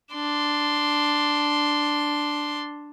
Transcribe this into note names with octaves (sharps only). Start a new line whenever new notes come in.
D4 C6